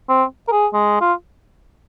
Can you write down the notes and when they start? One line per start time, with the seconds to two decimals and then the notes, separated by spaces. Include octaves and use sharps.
0.09 C4
0.48 A#4
0.52 G#4
0.73 G#3
1.01 F4